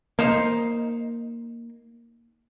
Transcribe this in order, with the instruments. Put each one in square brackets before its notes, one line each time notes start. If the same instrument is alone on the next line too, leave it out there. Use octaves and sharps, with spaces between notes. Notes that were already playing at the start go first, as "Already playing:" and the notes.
[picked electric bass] A#3 [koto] D#4 C5 F5